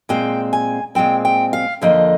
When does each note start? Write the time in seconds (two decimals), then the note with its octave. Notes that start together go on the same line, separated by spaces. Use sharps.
0.09 A#2 G#3 C4 G5
0.53 G#5
0.95 A#2 G#3 C4 G5
1.25 G5
1.53 F5
1.82 F2 D3 F3 A#3 D#5